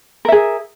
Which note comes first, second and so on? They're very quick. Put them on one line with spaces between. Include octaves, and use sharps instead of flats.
A#4 E5 G#4